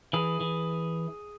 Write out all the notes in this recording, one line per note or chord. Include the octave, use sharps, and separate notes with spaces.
E3 G#4
E3